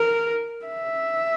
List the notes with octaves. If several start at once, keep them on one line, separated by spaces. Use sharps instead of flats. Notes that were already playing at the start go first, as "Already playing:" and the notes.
Already playing: A#4
E5